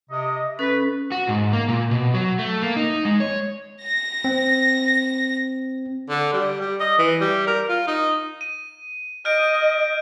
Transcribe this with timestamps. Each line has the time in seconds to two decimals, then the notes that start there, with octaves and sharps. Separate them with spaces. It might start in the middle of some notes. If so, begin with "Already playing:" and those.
0.10 C3 D#5
0.59 C#4 A4 B4
1.12 F#4
1.29 G#2
1.53 A#3
1.68 A#2
1.91 B2
2.14 F#3
2.39 A3
2.62 A#3
2.76 D#4
3.05 G#3
3.20 C#5
3.82 A#6
4.24 C4
6.09 D3
6.34 G3
6.61 G3
6.80 D#5
6.99 E3
7.21 G3
7.47 A#4
7.69 F4
7.88 D#4
8.41 D#7
9.25 D#5 F6 G6 D7